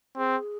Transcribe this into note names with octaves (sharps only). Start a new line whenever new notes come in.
C4 G#4